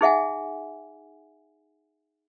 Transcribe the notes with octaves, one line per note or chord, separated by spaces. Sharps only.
D#4 G#4 E5 F#5 G#5